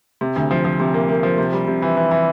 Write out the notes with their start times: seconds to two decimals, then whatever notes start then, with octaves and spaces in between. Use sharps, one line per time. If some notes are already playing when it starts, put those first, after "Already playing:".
0.21 C3
0.36 D2
0.51 F3
0.65 F3
0.80 C3
0.94 A#3
1.09 A#3
1.23 F3
1.38 C3
1.53 G3
1.67 C3
1.82 E3
1.97 E3
2.11 E3